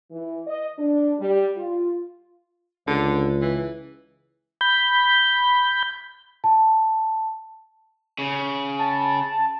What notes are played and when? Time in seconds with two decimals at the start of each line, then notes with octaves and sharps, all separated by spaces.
0.11 E3
0.47 D#5
0.79 D4
1.19 G3
1.57 F4
2.87 C#2 D3
3.41 E3
4.61 B5 G6
6.44 A5
8.19 C#3
8.79 A5